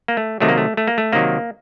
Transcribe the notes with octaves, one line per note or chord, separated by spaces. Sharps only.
A#3
A3
C3 D#3 F#3 A3
A#3
A3
A3
A#3
A3
C3 D#3 F#3 A#3